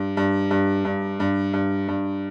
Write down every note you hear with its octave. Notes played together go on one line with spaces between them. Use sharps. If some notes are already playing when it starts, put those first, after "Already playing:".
Already playing: G2
G2
G2
G2
G2
G2
G2